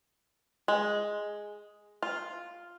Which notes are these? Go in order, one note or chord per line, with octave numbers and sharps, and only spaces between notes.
G#3
F4